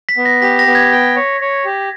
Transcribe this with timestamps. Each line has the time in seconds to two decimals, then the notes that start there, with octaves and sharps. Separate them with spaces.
0.09 B6
0.17 B3
0.26 A#6
0.42 G4 B6
0.59 A#6
0.66 B3
0.75 G#6
0.91 G5
1.16 C#5
1.40 C#5
1.65 G4